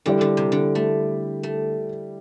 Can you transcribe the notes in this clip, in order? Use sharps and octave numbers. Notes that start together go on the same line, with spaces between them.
D3 G3 E4 G4 D5
D3
C3
D3
A3
A3